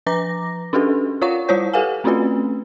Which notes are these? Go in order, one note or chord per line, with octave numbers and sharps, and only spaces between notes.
F3 B4 A#5 D6 A#6
C#4 D4 F#4 G4 A4 B4
F4 A#4 C#5 F5 F#5 C#6
G3 E4 F4 C5 C#5 G6
G4 A4 B4 F5 F#5 G#5
A3 C4 C#4 F4 F#4 B4